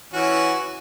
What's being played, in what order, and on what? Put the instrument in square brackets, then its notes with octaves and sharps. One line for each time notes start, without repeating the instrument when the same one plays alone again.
[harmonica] E3 C#4 F#4